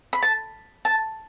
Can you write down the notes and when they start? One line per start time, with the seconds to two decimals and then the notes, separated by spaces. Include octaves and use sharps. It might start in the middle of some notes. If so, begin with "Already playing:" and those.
0.13 B5
0.22 A5
0.85 A5